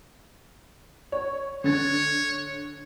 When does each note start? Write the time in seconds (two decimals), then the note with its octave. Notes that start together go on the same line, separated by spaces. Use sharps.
1.12 C#5
1.64 D3 C#5 A6